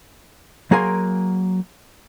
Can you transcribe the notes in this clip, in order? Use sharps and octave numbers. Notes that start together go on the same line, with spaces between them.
F#3 A#3 G#4 A#4 G#5 C6